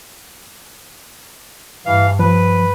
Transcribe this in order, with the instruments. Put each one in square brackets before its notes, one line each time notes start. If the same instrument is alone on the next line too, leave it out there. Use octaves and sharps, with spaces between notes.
[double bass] G2 [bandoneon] E3 F5
[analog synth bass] F3 [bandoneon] B4